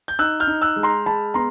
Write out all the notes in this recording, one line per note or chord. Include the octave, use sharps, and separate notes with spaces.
G6
D#4 E6 F#6
F6 G6
D#4
E6 F#6
G#3
A#5 C6
G#3 A5 B5
B3 A#5 C6